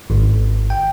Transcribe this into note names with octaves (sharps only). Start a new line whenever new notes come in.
G#1
G5